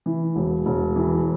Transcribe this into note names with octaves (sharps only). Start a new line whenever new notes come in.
E3
E1
E1
E3